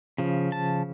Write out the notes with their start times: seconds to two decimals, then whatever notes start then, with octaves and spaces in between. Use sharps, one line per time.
0.18 C#3 F3
0.52 A5